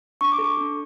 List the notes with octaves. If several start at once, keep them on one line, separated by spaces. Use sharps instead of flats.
D4 C#6
D6
A4
C#6
D4